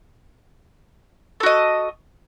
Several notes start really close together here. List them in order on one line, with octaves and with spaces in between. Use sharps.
A4 F#4 D#5